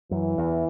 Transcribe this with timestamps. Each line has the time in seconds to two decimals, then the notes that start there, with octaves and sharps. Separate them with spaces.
0.11 F#2 E3
0.38 E2